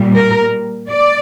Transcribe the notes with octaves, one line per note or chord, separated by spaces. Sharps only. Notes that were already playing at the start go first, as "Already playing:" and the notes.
Already playing: A#2 G3
A#4
D5